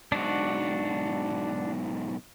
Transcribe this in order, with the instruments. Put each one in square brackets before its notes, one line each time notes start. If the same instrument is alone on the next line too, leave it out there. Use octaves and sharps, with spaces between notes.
[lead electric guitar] B1 G#2 [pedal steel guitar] D4 F#4